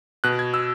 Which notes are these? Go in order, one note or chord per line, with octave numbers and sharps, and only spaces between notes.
B2 F#6
G#6
E6